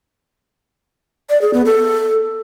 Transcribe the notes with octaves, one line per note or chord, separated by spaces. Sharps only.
D5
G#4
B3
A4